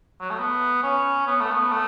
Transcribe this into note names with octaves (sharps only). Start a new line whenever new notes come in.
F#3
A3
B3
C#4
B3
A3
B3
A3